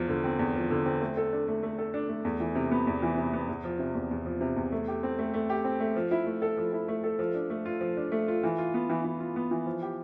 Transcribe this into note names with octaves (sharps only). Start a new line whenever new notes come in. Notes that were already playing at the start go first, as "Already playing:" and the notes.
Already playing: E2 F3
D3
C4
E2
F3
D3
C4
A3
A4
D4
A3
A3
A4
D4
A3
E2
E3
C3
B3
E2
E3
C3
B3
E2
F3
C3
E2
E2
F3
C3
E2
A3
G4
C4
A3
A3
G4
C4
A3
F3
E4
A3
A4
F3
E4
A3
A4
F3
D4
A3
F4
F3
D4
A3
F4
E3
F4
B3
E3
E3
F4
B3
E3
F3
G4